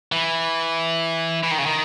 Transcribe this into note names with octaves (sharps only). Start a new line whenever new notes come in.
E3
E3
D#3
C#3
D#3